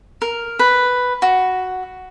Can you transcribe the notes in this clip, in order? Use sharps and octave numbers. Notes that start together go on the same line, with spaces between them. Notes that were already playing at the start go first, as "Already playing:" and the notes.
A#4
B4
F#4